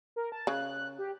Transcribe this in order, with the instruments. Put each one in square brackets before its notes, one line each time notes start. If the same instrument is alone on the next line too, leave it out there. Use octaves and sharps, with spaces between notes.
[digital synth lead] A#4
A5
[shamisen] C#3 [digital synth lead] F#6
[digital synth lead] G4